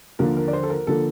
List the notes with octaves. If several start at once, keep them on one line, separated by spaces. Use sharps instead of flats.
D#2 D3 F3 A#3 A#4
A#4
D5
C5
A4
A#4
D3 F3 A#3 A4